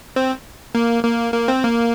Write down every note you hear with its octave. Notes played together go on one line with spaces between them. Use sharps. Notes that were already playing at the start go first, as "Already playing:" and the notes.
C4
A#3
A#3
A#3
C4
A#3